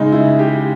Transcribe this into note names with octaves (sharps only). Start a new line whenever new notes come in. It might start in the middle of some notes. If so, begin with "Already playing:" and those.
Already playing: C#3 G#3 D#4
E4
G4